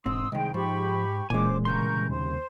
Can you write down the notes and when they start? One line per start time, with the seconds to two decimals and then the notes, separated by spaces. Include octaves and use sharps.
0.06 E1 G#2 C4 C6 D#6 E6
0.32 C2 D#3 G#3 G5
0.54 G#2 F3 G4 B5 C#6
1.30 D1 A#2 E3 G#3 C#4 C5 G#5 D6
1.65 C2 C#3 A#4 C6 C#6 G6
2.09 D#2 C5